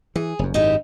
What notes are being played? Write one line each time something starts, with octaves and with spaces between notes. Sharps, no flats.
E3 G#4
F#1 F#2
G#1 F#2 D#4 E4 G4